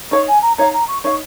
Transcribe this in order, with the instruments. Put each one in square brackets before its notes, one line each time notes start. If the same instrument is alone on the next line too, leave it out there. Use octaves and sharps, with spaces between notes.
[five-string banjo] D#4 C#5 F5 [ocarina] C#6
[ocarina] G#5
A#5
[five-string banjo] D#4 C#5 F5 [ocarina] A#5
[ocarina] A#5
C#6
[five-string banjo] D#4 C#5 F5 [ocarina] C#6